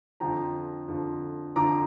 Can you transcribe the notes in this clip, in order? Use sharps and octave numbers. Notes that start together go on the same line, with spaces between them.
F2 D3 F3 G5 A#5
F2 D3 F3
F2 D3 F3 A#5 D6